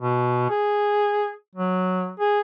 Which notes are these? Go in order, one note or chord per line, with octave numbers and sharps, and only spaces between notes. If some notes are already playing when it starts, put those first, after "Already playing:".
B2
G#4
F#3
G#4